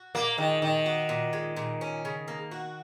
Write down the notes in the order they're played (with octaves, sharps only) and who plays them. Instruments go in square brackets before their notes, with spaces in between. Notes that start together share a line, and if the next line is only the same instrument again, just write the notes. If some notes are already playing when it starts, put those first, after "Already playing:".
Already playing: [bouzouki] F#4
[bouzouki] A#2 [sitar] A#3
[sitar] D#3 [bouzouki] G#3
[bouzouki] A#2 [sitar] D#3
[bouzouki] F#4
A#2
G#3
A#2
C#4
C#3
A#3
F#4